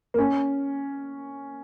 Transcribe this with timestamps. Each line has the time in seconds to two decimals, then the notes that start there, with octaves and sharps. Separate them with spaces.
0.14 A#3
0.18 C#4